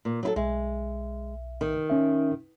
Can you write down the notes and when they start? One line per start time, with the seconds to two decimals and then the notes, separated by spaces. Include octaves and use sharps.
0.05 A#2
0.23 F#3 E4 A4
0.36 B1 G#3 E5
1.61 D#3
1.90 C#4 E5